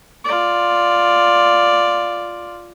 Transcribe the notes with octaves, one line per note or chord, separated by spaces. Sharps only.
F4 D5